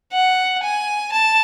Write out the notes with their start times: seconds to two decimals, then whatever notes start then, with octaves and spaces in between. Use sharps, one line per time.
0.12 F#5
0.63 G#5
1.13 A5